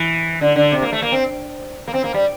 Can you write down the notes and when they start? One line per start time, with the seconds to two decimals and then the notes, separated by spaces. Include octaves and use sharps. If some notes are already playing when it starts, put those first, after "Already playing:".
Already playing: E3
0.41 D3
0.56 D3
0.72 C3
0.82 A#3
0.92 A3
1.02 A#3
1.12 C4
1.88 A#3
1.94 C4
2.04 A#3
2.14 G3